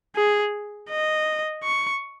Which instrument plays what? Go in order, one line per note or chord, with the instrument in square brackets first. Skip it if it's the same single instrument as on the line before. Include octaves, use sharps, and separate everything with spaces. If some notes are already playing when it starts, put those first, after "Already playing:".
[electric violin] G#4
D#5
C#6